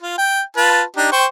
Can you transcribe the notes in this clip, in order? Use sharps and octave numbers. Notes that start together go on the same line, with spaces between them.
F4
G5
F4 B4 A5
D4 D#4 G4
C5 G5 C#6